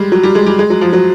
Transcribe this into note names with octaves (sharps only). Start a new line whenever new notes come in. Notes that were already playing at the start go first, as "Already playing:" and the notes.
Already playing: G3 G#3
F#3
G3
G#3
G3
G#3
F#3
F3
F#3